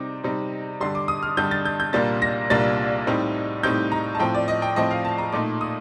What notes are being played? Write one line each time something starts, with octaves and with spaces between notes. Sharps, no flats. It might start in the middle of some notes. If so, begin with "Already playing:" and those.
Already playing: C3 G3 C4 D#4 D6
C3 G3 C4 D#4
G2 D3 G3 C6
D6
D#6
F6
G2 D3 G3 G6
A6
G6
G6
C2 A#2 G3 A#3 D4 A6
A#6
C2 A#2 G3 A#3 D4 A6
A2 G3 C4 D#4
A2 G3 C4 D#4 G6
A#5
A5
A2 F3 C4 G5
D5
D#5
G5
A2 F3 C4 D#5
F5
A5
A#5
A#2 A3 D#4 D6
D#6